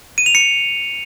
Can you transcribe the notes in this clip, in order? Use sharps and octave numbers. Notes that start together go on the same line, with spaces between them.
D#7
F7
C#7